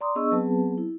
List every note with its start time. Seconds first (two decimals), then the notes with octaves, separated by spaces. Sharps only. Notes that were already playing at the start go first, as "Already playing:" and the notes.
0.01 D5 A#5 C6 D6 D#6
0.15 B3 D4 G#4 D#5 C#6 E6
0.32 F#3 B3 C4 G#4 B4 A5
0.78 E4